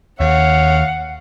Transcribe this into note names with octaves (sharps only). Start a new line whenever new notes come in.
D#2 C#5 F5 F#5